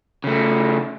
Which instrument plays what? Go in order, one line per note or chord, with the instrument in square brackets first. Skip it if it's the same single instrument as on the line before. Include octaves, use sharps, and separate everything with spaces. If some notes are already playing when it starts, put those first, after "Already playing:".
[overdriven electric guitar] C#3 A3